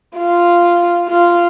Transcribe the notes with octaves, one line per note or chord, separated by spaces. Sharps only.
F4
F4